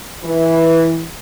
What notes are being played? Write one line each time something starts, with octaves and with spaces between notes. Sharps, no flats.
E3